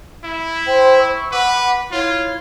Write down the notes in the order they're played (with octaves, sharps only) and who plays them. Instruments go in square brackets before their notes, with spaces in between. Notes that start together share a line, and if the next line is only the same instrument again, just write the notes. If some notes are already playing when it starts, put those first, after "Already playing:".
[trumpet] E4
[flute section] C5 G5
C#6 E6
[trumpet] B4 [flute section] F#5 D6
[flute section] E4 C#5 [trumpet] F4